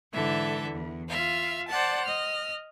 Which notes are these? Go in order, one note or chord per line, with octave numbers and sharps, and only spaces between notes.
G#2 D3 E3 A4 E5
E2
F4 E5 F5
C5 D5 F#5 A5
D#5 F6